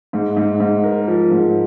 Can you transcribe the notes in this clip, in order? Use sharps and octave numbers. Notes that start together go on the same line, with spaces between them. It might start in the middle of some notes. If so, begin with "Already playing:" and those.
G#2
G#2
G#2
A#4
F3
G#2